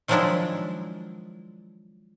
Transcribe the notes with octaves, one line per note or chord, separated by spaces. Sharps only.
D#3 F3 F#3 G#3 D4 E4